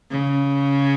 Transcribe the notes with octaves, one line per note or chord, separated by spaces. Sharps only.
C#3